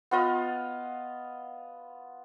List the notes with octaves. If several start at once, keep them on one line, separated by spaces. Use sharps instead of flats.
B3 F4 D#5 F5